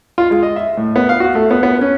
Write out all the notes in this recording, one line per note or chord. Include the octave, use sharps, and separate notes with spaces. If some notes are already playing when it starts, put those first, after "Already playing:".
F4
G#3
D#5
E5
A2
B3
F5
F#4
A3
B3
B3
C#4